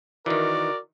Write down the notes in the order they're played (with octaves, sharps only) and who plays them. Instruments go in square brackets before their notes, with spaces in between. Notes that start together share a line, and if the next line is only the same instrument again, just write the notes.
[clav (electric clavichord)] D#3 E3 [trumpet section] F#4 A#4 D5